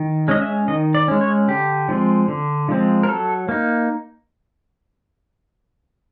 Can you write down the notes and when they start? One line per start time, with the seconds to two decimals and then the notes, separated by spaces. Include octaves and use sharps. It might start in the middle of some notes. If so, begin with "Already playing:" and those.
Already playing: D#3
0.28 G#3 C#4 D#5
0.41 E5
0.68 D#3 D#5
0.95 D5
1.08 G#3 C#4
1.21 C#5
1.48 D3 G4
1.89 F3 G#3 C4
2.28 D3
2.69 F3 G#3 C4
3.03 A#4
3.08 F#3 A4
3.49 A#3 D#4